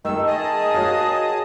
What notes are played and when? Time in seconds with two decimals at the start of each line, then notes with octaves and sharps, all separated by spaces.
0.05 D#3 A3 A4 E6
0.26 D#3 G#4 D#5 A5 D#6
0.74 F#4 C#5 F5